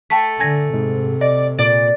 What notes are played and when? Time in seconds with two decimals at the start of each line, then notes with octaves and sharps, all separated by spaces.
0.10 A3 G5 A5 B6
0.40 D3 G#5 G#6 A#6
0.73 G#2 C3
1.21 D5 D#5
1.59 A#2 D5